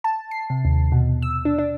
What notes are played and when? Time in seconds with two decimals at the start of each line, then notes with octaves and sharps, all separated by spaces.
0.04 A5
0.31 C7
0.50 C3
0.65 D#2
0.92 B2
1.22 E6
1.45 D4
1.58 D4